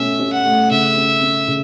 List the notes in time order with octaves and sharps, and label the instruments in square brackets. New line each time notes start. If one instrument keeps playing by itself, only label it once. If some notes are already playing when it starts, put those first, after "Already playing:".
Already playing: [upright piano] B2 A3 C#4 [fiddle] E5
[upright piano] C#4
[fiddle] F#5
[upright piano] A3
[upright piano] C#3 [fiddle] E5
[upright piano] C#4
C#4
C#3